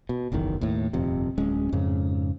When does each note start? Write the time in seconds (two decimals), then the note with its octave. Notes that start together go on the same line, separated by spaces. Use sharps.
0.09 B2
0.32 F#1 B1 E2 D#3
0.61 D#2 A2
0.93 D#1 F2 C3
1.38 D1 G#3 C#4
1.72 F2 G#2 C#3